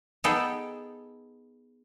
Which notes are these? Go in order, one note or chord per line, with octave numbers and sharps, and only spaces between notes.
B3 D#4 G#4 A4 G5